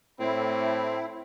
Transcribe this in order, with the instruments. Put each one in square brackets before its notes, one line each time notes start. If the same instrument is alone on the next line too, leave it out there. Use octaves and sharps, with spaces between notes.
[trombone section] A2 [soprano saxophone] C4 [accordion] E4